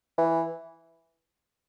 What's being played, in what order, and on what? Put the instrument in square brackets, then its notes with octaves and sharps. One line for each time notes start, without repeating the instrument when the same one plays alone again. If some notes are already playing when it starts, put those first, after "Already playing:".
[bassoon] E3